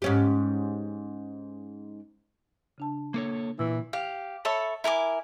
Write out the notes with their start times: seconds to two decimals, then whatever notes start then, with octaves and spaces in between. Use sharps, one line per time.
0.02 G#2 C#4 G4
2.78 C#3 D4 A5
3.14 A#3 A4 C#5
3.59 A#2 E3 E6
3.93 G4 F5
4.45 A4 C#5 E5 B5
4.84 E4 A#4 G#5 D6